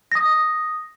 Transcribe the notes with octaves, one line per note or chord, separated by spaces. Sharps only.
D#6 A#6